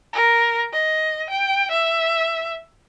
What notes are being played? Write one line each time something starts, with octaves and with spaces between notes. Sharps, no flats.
A#4
D#5
G5
E5